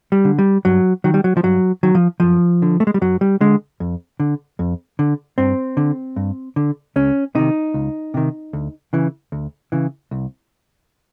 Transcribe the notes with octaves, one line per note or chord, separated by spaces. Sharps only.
G3
D3
G3
G2 F#3
D#3 F#3
G3
F#3
F3
G2 F#3
D#3 F#3
F3
F#2 F3
D3
A3
G#3
G3
F#2 F#3
G3
D3 G#3
F2
D3
F2
D3
G2 C4
D3
G2
D3
C#2 C#4
C3 D#3 D#4
C#2
C3 D#3
D2
C#3 E3
D2
C#3 E3
C2